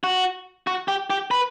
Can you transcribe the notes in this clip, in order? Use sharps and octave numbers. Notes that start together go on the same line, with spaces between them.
F#4
F#4
G4
G4
B4